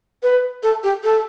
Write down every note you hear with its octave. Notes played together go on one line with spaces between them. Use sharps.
B4
A4
G4
A4